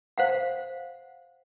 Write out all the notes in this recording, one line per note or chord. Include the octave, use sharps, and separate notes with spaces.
C5 F5 F#5